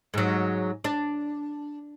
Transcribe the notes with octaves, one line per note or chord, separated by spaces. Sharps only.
G#2 F#3
D4